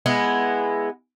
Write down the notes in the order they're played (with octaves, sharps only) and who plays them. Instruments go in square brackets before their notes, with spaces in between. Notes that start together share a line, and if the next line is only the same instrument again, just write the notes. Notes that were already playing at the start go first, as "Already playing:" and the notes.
[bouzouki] G#3 B3 E4